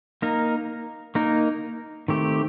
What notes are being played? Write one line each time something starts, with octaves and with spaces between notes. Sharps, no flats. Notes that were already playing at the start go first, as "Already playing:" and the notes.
A#3 D#4 A#4
A#3 D#4 A#4
D#3 A3 C4 G4